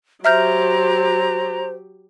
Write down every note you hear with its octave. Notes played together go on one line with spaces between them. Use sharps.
F#3 G4 C5 E5 A#5 F6 G6